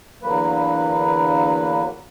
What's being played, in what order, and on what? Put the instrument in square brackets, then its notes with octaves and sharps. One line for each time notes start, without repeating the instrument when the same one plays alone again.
[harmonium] E2 D3 F#3 A#3 B4